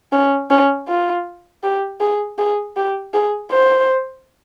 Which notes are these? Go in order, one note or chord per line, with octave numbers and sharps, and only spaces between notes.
C#4
C#4
F4
G4
G#4
G#4
G4
G#4
C5